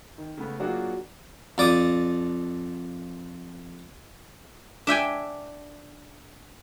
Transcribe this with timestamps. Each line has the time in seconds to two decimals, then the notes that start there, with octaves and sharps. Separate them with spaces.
0.18 D#3
0.37 C#3 A3 B3
0.59 F#3 A#3 D4 F4 F#4 G#4
1.58 F2 D5 D#6
4.87 D4 E5 G5 G#5